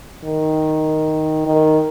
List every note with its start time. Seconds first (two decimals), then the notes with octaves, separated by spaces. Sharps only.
0.24 D#3
1.46 D#3